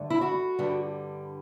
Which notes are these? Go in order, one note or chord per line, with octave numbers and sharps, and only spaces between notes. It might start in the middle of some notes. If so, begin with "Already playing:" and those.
Already playing: G2 D3 A3
E4
F#4
G2 D3 G3